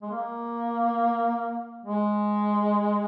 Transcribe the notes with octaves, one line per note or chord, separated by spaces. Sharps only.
G#3
A#3
G#3